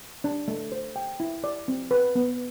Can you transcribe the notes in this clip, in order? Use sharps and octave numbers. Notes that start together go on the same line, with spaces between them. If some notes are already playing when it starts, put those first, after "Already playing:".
D4
A3
C5
G5
E4
D5
C4
B4
B3